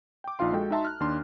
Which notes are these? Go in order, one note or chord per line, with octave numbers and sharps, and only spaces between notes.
G5 D6
A#1 D#4 F4 F5 C6
G#3 F#4 A4 G5
D#4 F#4 E5 A5 A#5 C6
F6 F#6
D#2 D4 C6